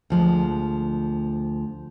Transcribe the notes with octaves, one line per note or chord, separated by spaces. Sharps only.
D2 F3 G#3